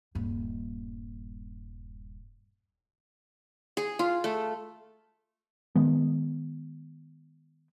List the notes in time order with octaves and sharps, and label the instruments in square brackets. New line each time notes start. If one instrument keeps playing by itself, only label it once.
[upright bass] D#1 G2
[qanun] G#4
F4
A3
[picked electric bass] D#3 G#3 B3